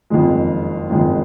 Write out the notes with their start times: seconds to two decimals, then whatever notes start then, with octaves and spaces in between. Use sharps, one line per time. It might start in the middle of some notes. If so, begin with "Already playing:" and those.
0.10 F#1 F2 D#3 G#3
0.90 F#1 F2 D#3 G#3